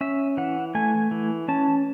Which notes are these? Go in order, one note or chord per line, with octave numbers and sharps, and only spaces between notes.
C#4 E5
E3 F#5
A3 G#5
E3
C#4 A5